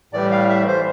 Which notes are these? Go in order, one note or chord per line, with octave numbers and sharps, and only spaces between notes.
A2 E3 G3 D5
F5
E5
C5